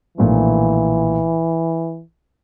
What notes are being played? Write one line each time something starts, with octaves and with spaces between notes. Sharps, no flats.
B1 A#2 E3 F3 A3 D4